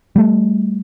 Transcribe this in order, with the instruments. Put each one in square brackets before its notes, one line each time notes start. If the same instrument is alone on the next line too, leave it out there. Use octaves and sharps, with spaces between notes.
[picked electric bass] G3 A3